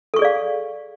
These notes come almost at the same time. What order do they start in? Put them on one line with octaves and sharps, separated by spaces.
A4 C#6 G#4 D5 F5